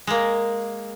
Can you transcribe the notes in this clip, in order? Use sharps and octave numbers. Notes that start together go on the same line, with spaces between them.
G#3 A#3